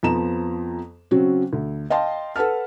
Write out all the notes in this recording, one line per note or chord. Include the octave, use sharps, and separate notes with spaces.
F2 F3 B3 A#5 E7
C#3 F#3 C4 C#4 F#4
D2
D#5 F5 G5 A5 C6
A4 B4 F#5 A5 F6